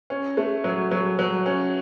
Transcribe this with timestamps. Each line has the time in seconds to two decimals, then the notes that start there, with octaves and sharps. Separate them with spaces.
0.10 C#4
0.37 A3
0.64 F#3
0.91 F#3
1.19 F#3
1.46 C#4